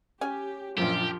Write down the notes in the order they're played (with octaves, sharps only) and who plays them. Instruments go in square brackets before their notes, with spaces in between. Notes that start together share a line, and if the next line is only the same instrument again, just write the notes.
[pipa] C#4 G#5 [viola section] G4
[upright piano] A#1 F#2 [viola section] F3 F4 [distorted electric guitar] G4